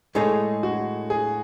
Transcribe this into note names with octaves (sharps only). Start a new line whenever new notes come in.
A2 G#3 D#4 G#4 A4 C#5
F#4
G#4